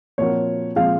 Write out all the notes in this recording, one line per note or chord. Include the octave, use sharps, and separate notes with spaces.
A#2 F3 C4 F#4 A#4 C#5
A#2 F3 G#3 C4 F5